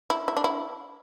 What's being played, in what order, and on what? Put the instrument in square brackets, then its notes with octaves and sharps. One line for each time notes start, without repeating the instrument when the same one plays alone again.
[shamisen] E4
E4
D4
E4